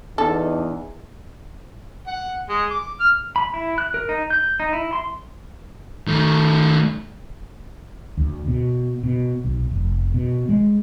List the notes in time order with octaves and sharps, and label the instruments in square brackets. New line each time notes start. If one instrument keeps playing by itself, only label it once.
[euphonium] E2 [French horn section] B3 D4 D#4 [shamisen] A4
[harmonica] F#5
G#3
D6
F6
[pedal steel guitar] B5
E4
F#6
A#4
D#4
G6
D#4
E4
C6
[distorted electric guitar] D#3 A3
[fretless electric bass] D2
B2
B2
B1
F1
B2
G#3